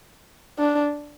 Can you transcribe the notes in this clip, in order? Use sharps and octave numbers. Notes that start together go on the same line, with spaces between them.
D4